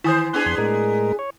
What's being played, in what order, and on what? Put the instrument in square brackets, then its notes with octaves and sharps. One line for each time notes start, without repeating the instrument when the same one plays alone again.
[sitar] D#3 E3 C5 [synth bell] E4 G#5 D#6
[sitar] B3 D4 G#4
[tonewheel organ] F2 C6
A2 G#3 A#4
C#5